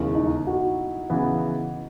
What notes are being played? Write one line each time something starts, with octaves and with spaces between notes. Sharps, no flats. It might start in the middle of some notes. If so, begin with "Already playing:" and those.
Already playing: E1 D#2 C#3 E4
D#4
F#4
C#3 E3 B3